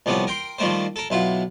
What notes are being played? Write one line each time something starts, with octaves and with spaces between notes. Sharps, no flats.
C2 F3 G3 B3 C#4
A#4 G5 C6
D#3 F3 G3 A3 A#4 C5
A4 A#4
B1 E4 F4 F#5